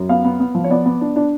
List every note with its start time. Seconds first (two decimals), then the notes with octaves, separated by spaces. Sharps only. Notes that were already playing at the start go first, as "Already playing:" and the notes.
Already playing: F#2
0.09 B3 F5
0.25 B3
0.40 B3
0.55 F3
0.64 C#5
0.70 B3 D5
0.86 B3
1.01 D4
1.16 D4